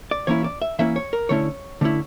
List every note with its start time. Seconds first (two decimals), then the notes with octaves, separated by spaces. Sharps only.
0.11 D5
0.27 E3 A#3 C#4 E4 C#5
0.44 D5
0.62 E5
0.79 E3 A#3 C#4 E4 E5
0.96 C#5
1.13 A#4
1.29 D3 A3 C#4 E4 C#5
1.81 D3 A3 C#4 E4